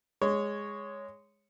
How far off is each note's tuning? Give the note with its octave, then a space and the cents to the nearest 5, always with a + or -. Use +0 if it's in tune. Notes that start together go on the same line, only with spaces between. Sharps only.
G#3 -10 C#5 +0